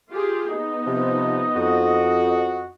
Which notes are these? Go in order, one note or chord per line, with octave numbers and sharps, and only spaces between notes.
F4 G4 G#4
B3 D#4 D#5
C3 F3
F2 F#4